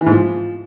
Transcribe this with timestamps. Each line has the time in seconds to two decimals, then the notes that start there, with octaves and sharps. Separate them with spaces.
0.01 E3
0.06 G#2
0.12 F3